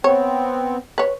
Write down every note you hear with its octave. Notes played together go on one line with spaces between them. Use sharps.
B3 C4 C#5
B4 C#5